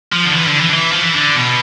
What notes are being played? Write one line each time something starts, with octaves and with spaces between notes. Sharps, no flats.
F3
D3
E3
D3
E3
D3
E3
F3
E3
D3
B2